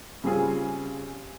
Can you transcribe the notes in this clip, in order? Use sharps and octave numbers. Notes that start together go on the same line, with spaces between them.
C#3 G3 C4 F4 G#4